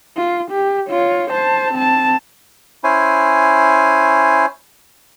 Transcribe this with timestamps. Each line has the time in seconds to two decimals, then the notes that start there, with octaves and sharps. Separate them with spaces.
0.17 F4
0.51 G4
0.89 F4 C#5
1.31 C5 A5
1.74 C4 A5
2.84 C#4 E4 C5 G#5